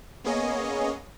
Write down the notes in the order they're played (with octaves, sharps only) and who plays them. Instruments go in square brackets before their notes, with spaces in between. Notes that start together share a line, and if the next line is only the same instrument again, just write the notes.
[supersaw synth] A#3 B3 C#4 G#4 C#5 D#5